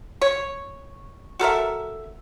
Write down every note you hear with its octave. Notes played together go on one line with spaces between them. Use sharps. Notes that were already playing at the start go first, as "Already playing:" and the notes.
C#5
F#4 A4 A#4 E5